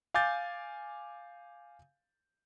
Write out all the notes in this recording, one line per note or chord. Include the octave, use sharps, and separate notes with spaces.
F5 G#5 D6 G6 A6